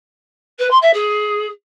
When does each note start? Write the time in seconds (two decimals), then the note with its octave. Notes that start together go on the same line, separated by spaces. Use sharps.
0.59 B4
0.70 C6
0.82 E5
0.93 G#4